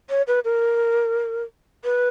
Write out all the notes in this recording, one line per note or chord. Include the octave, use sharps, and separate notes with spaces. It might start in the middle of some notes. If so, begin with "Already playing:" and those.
C#5
B4
A#4
B4